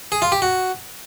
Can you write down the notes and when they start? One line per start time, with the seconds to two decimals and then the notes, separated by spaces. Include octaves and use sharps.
0.12 G#4
0.22 F4
0.32 G4
0.42 F#4